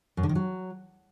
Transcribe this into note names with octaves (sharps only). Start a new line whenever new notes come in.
F#2
D3
D#3
F#3